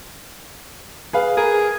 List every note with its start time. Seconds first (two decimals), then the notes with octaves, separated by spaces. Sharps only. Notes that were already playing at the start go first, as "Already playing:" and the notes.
1.13 G#4 B4 F5
1.37 G#4 A#4